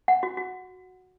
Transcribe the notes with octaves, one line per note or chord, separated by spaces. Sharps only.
F#5
F#4
F#4